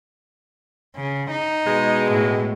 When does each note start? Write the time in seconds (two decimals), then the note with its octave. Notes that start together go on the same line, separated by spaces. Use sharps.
0.96 C#3
1.30 D#4
1.66 B2 G#3
2.12 A2